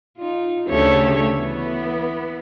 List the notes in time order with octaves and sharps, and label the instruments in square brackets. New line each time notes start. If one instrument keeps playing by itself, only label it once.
[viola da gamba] D#4 F4
[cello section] D2 C#3 A3 [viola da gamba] G4 A4 C#5
[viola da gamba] E3 [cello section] B3